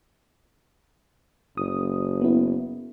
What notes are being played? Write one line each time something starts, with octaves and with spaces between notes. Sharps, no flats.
F#1 D#6
B3 E4